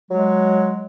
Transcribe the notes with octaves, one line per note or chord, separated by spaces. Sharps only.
F#3 G#3